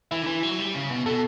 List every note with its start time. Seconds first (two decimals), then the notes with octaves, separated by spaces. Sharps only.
0.11 E3 E4
0.22 D3
0.27 E3
0.43 F#3
0.59 G3
0.75 C#3
0.90 B2
1.06 B2 A4